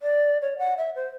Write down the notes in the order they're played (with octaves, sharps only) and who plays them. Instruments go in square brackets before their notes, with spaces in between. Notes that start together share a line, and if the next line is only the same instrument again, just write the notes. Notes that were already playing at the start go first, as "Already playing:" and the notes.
[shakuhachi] D5
C#5
F#5
E5
C5